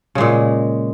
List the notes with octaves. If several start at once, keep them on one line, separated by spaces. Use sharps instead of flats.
A#2 C#3 G#3